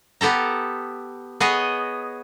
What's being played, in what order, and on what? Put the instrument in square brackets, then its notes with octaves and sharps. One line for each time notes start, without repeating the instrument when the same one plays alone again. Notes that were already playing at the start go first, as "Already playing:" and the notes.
[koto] B3 G4 A4 A#5
B3 G#4 C#5 D#5